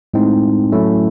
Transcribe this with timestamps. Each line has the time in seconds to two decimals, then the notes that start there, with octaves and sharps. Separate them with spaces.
0.14 A2 G#3 C4 D#4
0.72 A2 F#3 A3 C#4 E4